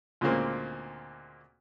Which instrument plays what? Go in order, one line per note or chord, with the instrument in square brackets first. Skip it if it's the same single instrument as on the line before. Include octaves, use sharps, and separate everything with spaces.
[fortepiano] D2 A#2 C#3 G#3 A#3 C4